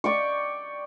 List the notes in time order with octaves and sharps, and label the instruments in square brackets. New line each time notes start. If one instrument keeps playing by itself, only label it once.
[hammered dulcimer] D5 G5 C#6